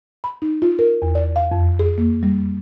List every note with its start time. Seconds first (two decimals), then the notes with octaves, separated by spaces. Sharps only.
0.24 B5
0.42 D#4
0.62 F4
0.79 A#4
1.02 E2
1.15 D5
1.36 F5
1.51 F2
1.79 G#4
1.98 A#3
2.23 G3